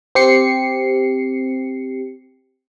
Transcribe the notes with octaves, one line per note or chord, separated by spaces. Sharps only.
C4 G4 C7 C#7